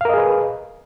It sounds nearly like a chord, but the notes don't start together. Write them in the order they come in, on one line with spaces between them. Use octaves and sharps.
F5 A#4 D#5 G#4 B4